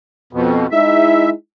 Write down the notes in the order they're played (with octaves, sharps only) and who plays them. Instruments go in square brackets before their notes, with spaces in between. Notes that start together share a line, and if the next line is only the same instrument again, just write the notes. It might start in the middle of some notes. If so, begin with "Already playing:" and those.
[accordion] F2 B2
[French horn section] G#3 D#4 E4 [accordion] E5